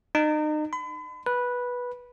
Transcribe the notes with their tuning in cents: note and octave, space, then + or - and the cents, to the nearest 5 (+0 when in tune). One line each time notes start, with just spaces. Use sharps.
D#4 -35
B5 +40
B4 -10